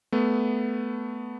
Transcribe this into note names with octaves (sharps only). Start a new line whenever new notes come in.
A3 B3